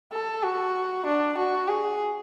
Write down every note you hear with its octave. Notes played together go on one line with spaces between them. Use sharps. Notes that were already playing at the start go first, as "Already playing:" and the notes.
A4
F#4
D4
F#4
G#4